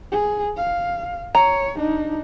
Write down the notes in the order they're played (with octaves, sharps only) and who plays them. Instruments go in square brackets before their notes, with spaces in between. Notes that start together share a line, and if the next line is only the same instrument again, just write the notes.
[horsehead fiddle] G#4
F5
[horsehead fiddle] C#5 [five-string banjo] A#5
[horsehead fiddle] D4 D#4